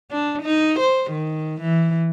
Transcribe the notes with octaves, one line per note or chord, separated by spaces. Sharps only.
D4
D#4
C5
D#3
E3